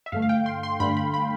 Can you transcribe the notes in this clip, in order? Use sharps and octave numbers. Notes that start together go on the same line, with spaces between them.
E5
G2 D3 A3 F5
F5
G5
C6
C6
G2 D3 A3 B5
B5
B5